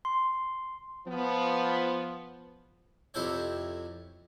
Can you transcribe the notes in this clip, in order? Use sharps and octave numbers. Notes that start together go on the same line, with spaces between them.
C6
F3 B3
F2 C3 E4 A4 C5 C#5